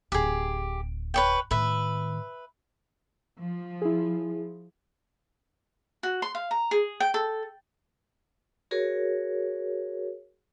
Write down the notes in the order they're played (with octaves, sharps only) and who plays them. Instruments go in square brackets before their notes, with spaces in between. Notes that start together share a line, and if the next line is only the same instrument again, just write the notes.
[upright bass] D1 [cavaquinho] G4 G#4
[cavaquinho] B4 C#5 G5
[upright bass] A2 D#3 [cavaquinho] B4 E5
[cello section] F3
[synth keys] E4 G#4
[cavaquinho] F#4
C6
F5
A#5
G#4
G5
A4
[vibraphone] F#4 G#4 A#4 C#5